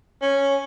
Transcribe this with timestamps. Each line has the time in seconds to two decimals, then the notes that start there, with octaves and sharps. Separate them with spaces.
0.22 C#4